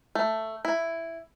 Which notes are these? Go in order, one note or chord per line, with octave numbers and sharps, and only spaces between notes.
A3
E4